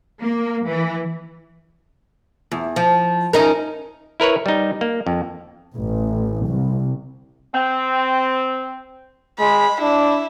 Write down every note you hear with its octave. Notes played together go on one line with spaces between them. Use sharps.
A#3
E3
E2
F3
C#4 D#4 A#4
E4 A#4 B4 C#5
G3 D#4
A#3
F2
A1
C2
C4
G#3 B5
D4 E4